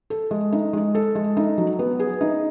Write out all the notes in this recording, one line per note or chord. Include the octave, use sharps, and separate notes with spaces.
A4
G#3
D#4
G#3
A4
G#3
D#4
F#3
B3
G#4
D#4